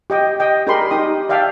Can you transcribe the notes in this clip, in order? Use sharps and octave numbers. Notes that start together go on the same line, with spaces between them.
G4 D#5 G5
D#5 G5
D4 G4 G#4 A#4 B5 C6
D#4 G4 D#6
D5 E5 F5 G5 A5